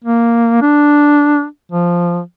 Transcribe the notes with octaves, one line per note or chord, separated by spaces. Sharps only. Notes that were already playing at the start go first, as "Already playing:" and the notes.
A#3
D4
F3